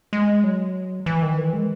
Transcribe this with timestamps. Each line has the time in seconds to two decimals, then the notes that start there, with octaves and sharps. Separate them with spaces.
0.13 G#3
0.44 F#3
1.06 E3
1.22 D#3
1.38 E3
1.53 G#3